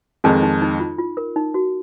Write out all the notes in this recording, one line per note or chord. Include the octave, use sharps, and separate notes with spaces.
F2 D#3 G#3 D#4
D#4
D#4
F4
F4
A#4
D#4
F#4